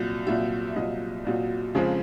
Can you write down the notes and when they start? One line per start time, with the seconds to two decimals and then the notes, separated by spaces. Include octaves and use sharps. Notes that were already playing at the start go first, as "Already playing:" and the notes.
Already playing: C2 A#2 F#3
0.27 C2 A#2 F#3 E5
0.68 E5
0.76 C2 A#2 F#3 D#5
1.25 C2 A#2 F#3
1.75 F2 C#3 F3 G#3 C4